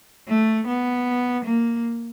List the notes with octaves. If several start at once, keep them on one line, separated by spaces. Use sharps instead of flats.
A3
B3
A#3